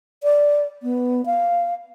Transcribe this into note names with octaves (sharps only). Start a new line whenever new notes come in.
D5
B3
F5